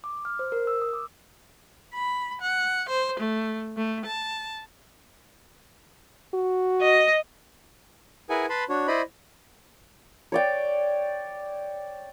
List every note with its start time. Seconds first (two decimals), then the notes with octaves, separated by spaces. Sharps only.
0.04 D6
0.25 F6
0.39 C5
0.52 A#4
0.67 E6
0.81 D#6
0.93 D6
1.94 B5
2.42 F#5
2.89 C5
3.20 A3
3.77 A3
4.06 A5
6.34 F#4
6.81 D#5
8.30 E4 G#4 A#4 B4 F#5 G#5
8.49 B4 A5 B5 C6
8.69 D4 F#4 C#5
8.87 E4 C5 D5 D#5 B5
10.32 C#5 D5 G5